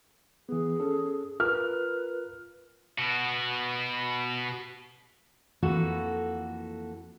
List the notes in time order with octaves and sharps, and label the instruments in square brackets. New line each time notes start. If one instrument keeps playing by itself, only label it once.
[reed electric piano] E3 B3 [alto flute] G#4
[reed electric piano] C#4 A4
[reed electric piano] F4 A#4 [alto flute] B4 [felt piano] F6
[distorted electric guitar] B2 F#4
[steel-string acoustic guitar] F2 E3 A#3 F#4 A4